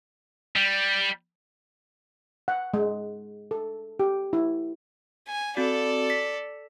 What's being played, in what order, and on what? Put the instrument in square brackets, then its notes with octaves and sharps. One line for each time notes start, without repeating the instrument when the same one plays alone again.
[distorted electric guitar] G3
[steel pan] F#5
G#3
A4
G4
E4
[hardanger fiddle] G#5
[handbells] C4 F#4 [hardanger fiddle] A4 D5
[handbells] B6